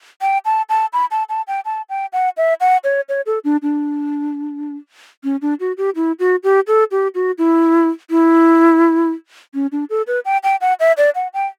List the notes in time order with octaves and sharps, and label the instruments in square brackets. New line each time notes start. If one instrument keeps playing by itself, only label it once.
[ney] G5
A5
A5
B5
A5
A5
G5
A5
G5
F#5
E5
F#5
C#5
C#5
A4
D4
D4
C#4
D4
F#4
G4
E4
F#4
G4
A4
G4
F#4
E4
E4
C#4
D4
A4
B4
G5
G5
F#5
E5
D5
F#5
G5